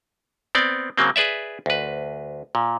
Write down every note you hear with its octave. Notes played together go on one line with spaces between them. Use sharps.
B3 C4 D5
C#3 F#3 A#3 C4
G#4 B4 D5 E5
D2 B4
A#2